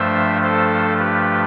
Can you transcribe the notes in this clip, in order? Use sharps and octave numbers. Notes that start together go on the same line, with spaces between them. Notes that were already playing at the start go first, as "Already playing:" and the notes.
Already playing: G2 F3 A3 C5 E5
A4 C5
G4 B4